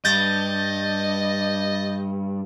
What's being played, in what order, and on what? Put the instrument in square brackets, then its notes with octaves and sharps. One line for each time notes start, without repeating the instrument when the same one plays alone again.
[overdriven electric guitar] G2 [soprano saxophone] D#5 [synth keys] G6 A6 A#6